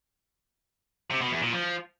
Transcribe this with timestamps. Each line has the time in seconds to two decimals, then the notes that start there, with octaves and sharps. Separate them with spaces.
1.10 C3
1.21 B2
1.32 E2
1.42 A#2
1.53 F3